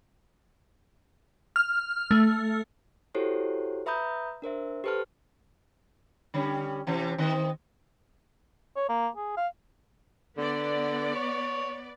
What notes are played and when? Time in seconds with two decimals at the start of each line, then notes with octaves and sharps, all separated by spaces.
1.56 F6
2.11 A3
3.15 E4 F#4 G4 A4 C5 C#5
3.86 B4 E5 A#5 B5 D#6 G6
4.42 D4 A#4 C5 E5
4.84 G4 A4 B4 C5 A5 F6
6.34 D3 G3 C#4
6.87 C3 E3 C#4
7.18 D#3 C4 D#5
8.77 C#5
8.89 A#3
9.16 G#4
9.37 F5
10.37 D3 B3 D5
11.16 C#5